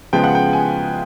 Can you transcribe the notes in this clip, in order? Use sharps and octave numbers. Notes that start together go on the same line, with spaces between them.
C#3 F3 G#3 B3 G5
F#5
G5
G#5